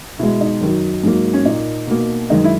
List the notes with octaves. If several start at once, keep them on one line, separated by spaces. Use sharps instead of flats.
B2 G#3 E4
D#4
F#2 D#3 F#3
G#2 F#3 A#3
C#4
A#2 A#3 D#4
B2 A#3
F#2 D#3 G#3 D#4
E4